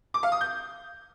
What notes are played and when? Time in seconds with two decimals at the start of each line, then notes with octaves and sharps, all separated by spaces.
0.14 D6
0.23 F5
0.32 D#6
0.41 G6